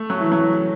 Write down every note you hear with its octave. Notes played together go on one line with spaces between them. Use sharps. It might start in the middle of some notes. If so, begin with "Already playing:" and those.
Already playing: A3
F#3
E3
F#3